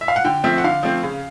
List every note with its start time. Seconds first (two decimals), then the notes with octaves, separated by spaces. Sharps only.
0.01 E5
0.08 F5
0.16 F#5
0.24 D3 G5
0.44 F3 A3 C4 E5
0.58 F#5
0.64 D3 F5
0.83 F3 A3 C4
1.03 C#3